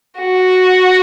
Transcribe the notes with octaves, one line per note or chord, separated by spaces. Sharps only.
F#4